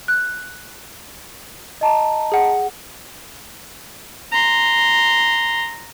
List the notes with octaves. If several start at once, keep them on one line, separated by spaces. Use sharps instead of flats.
F#6
D#5 A5 A#5
G#4 F#5
A#5 C6